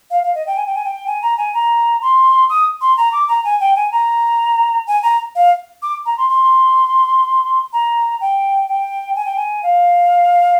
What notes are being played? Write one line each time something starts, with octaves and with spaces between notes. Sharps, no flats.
F5
F5
D#5
G5
G#5
G5
G#5
G5
G#5
A#5
G#5
A#5
C6
D#6
C6
A#5
D6
A#5
G#5
G5
G#5
A#5
G#5
A#5
F5
D6
A#5
C6
C6
A#5
G5
G5
G#5
G5
G#5
F5